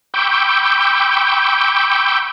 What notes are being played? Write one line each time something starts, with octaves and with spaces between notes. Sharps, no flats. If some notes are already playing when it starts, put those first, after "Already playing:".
G5 B5 C#6 D6 E6 G6